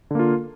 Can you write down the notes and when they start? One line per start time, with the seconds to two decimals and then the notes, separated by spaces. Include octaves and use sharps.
0.11 D3
0.15 A#3
0.19 F4